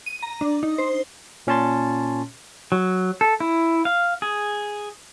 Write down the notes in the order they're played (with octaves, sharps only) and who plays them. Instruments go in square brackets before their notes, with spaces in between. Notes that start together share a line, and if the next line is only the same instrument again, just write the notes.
[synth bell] D#7
A#5
D4
D#4
C5
[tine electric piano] A#2 C#4 C#5 A5 C6 A6
[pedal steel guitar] F#3
A4
E4
F5
G#4